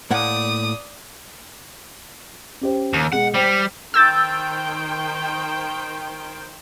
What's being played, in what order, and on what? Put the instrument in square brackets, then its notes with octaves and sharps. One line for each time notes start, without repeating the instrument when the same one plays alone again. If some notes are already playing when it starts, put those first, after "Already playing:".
[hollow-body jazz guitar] A2 A#3 F#5 [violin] D5 D#6
[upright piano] C#4 G4 C5
[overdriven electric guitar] D#2
[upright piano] B2 G#3 B3 [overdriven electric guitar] F#5
[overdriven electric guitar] G3 [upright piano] C5 G5
[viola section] D#3 C5 G5 [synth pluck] E6 G6 A6